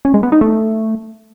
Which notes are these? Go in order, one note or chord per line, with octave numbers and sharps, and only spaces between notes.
C#4
G#3
B3
D#4
A3